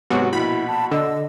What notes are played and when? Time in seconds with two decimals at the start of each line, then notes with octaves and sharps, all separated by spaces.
0.10 G#2 C3 F#3 B3 F#4
0.33 A#1 B2 E4 F#4 B5
0.67 A5
0.91 D3 D#5 E6